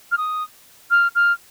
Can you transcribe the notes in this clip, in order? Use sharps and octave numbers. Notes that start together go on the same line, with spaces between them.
F6
D#6
F6
F6